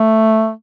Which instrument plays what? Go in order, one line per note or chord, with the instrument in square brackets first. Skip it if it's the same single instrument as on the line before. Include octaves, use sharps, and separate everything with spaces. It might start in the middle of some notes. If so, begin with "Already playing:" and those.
Already playing: [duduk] A3